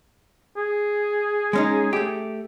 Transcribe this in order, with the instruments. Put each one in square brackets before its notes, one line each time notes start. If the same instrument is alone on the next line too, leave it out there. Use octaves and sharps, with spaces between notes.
[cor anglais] G#4
[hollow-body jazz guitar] G#3 C#4 D#4
A3 G4